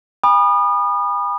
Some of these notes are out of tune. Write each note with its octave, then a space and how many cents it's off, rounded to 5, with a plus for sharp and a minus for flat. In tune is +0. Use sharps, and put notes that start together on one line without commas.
G#5 -45 B5 -20 D#6 -35